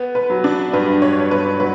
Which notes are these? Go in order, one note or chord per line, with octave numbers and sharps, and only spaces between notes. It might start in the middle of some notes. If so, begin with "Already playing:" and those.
Already playing: B3
B4
F#3
D4
G2 B4
C#5
G2
B4
F#3 B4